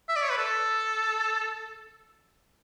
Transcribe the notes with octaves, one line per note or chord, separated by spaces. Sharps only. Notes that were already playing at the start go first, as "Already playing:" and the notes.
E5
D5
C#5
B4
A4